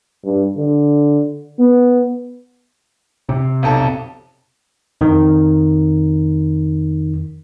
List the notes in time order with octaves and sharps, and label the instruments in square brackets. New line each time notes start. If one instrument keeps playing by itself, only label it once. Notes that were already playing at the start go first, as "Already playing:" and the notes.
[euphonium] G2
D3
B3
[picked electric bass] C3
[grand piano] B1 F2 A4
[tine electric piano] F2 D#3